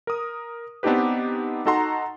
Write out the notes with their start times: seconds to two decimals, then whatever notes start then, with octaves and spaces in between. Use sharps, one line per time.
0.07 A#4 D#6
0.83 B3 C4 D4 D#4 G4 B4
1.66 D#4 F#4 A4 F#5 A#5 C6